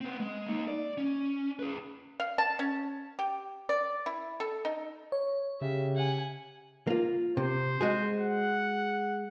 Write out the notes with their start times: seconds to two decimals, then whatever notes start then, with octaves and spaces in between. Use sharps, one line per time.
0.01 B3 C4
0.20 G#3
0.46 A#3 D#4
0.68 D5
0.98 C#4
1.59 G#4 B4
2.20 F5
2.38 A5
2.59 C#4
3.19 G4
3.69 D5
4.06 E4
4.40 A4
4.65 D#4
5.12 C#5
5.61 C#3 G4 E5
5.96 F#5 G#5
6.87 A#3 F4
7.37 C3 C5
7.81 G#3 F#4 G#4
8.20 F#5